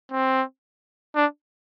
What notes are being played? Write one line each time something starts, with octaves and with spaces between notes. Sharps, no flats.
C4
D4